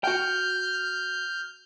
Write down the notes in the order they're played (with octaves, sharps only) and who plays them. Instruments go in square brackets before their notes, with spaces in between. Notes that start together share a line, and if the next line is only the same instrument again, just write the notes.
[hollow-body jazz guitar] F#4 G5 [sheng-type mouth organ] F6 G6